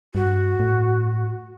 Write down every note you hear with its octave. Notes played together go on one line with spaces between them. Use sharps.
G2 F#4
A2